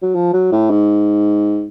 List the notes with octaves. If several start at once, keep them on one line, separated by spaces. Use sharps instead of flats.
F#3
F3
F#3
A2
G#2